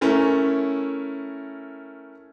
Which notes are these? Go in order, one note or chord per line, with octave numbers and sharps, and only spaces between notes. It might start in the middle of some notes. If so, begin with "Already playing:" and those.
A3 C#4 E4 A#4